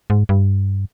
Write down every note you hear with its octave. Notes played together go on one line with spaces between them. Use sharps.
G#2
G2